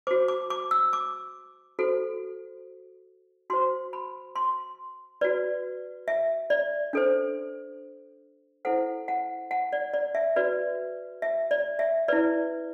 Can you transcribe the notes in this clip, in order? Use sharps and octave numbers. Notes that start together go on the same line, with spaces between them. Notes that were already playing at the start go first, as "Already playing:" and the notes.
F#4 C5 D6
D6
D6
E6
D6
F#4 A4 C5
F#4 C5 C6
B5
C6
F#4 B4 D5
E5
D5
D4 A4 C5
E4 A4 C5 F#5
F#5
F#5
D5
D5
E5
F#4 B4 D5
E5
D5
E5
E4 B4 D5